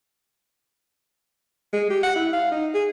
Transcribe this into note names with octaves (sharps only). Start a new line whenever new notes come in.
G#3
G4
F#5
E4
F5
D#4
G#4